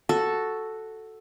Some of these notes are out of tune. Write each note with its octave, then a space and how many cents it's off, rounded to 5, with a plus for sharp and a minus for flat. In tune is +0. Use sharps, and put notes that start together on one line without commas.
F#4 +0 A4 +0